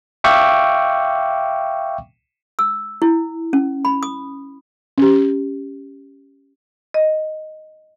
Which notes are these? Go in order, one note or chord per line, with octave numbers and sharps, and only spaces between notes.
E5 F5 G5 C#6 D6
E6
E4
C#4
B5
D#6
C#4 G4
D#5